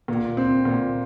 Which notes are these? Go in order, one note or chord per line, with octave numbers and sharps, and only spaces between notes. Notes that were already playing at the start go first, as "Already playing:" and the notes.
A#2
C4
A#2